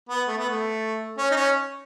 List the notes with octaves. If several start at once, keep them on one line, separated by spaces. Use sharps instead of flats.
B3
A3
B3
A3
C#4
D#4
C#4